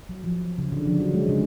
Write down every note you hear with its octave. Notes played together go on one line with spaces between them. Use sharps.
F#3
F3
C#3
D3
F3
F#3
G#3
C#3